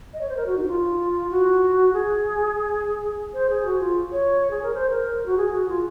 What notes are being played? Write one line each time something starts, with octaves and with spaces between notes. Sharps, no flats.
D#5
C#5
C5
A#4
F#4
D#4
F#4
F4
F#4
G#4
C5
G#4
F#4
F4
C#5
G#4
A#4
C5
A#4
F#4
G#4
F#4
F4